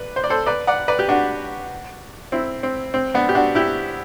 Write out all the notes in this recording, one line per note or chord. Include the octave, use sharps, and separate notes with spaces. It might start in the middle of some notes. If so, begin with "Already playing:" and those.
Already playing: B4 D5
C5
D5
A4 C5
B4 D5
D5 F#5
B4 D5
G4
D4 F#4
C4 E4
C4
C4
B3 D4
G4
D4 F#4
E4 G4